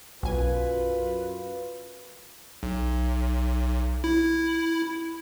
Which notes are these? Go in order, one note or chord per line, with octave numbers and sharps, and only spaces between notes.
B1 F#2 F4 B4 G#5
B1
E4